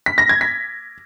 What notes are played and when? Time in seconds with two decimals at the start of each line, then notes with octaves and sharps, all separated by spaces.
0.06 B6
0.18 A#6
0.29 G#6
0.41 B6